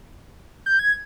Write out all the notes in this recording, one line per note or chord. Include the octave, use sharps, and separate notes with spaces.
G6
G#6